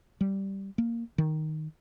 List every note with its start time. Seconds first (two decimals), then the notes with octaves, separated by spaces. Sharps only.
0.21 G3
0.78 A#3
1.18 D#3